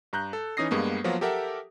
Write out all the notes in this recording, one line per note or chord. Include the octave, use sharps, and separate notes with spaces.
G2 A#5 F#6 G6
A4
E3 C#4 D#4 D#6 A#6 C7
G2 G#3 A#3 B3
F3 F#3 A#3 B3 F4 F#4
G4 A4 A#4 E5 F#5